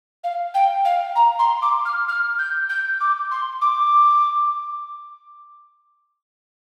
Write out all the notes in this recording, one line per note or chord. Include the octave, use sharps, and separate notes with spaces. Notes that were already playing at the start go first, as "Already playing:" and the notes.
F5
G5
F5
A#5
C6
D6
F6
F6
G6
G6
D6
C6
D6